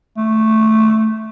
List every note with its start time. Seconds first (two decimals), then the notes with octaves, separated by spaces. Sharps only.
0.18 A3